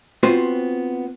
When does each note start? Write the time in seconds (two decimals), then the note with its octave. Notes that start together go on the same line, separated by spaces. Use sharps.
0.23 B3 C4 F4 F#4 C5